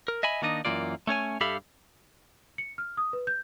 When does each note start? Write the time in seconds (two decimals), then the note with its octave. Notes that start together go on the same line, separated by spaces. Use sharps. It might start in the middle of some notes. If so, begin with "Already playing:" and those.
0.08 A#4
0.23 D#5 E5 G#5 B5
0.42 D#3 A#3 D4 D#4 D#5
0.65 F#2 D3 E3 A#3 F4 D5
1.07 A3 C#4 C#5 G#5
1.41 G2 G4 A4 E5 F5 B5
2.58 C#7
2.78 F6
2.97 D#6
3.13 B4
3.27 G6